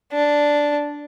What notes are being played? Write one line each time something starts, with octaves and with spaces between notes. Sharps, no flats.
D4